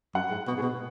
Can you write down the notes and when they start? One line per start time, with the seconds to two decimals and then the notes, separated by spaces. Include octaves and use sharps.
0.15 F#2 F#5
0.31 G#2
0.48 B2
0.57 G#2
0.63 B2